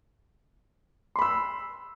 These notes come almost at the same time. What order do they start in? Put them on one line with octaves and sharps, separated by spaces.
C6 B5 E6